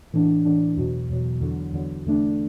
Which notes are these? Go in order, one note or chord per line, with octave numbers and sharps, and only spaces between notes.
A2 E3 D4
A2 E3 D4
E2 B2 F#3
E2 B2 F#3
E2 D3 F#3
E2 D3 F#3
E2 D3 A3 D4